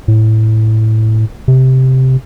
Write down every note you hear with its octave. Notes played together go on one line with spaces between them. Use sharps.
A2
C3